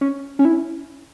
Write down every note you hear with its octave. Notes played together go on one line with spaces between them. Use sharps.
C#4
C#4
E4